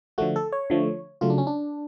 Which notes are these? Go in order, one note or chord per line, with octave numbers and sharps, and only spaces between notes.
D3 F3 A3 F#4
A4
C#5
D3 F3 A3
C#3 F#3 A3 F4
D4
C#4
D4